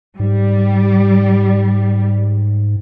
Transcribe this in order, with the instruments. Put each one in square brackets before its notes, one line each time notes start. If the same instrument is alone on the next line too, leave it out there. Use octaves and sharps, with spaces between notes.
[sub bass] G#2 [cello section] G3